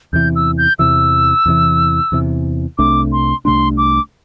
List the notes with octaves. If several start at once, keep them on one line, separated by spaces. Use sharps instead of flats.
E2 C3 E3 G6
E6
G6
E2 C3 E3 E6
E2 C3 E3
E2 C3 E3
C2 C3 A3 D4 D6
C6
C2 C3 A3 D4 C6
D6